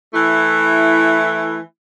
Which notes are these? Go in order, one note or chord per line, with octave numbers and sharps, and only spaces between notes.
E3 A3 E4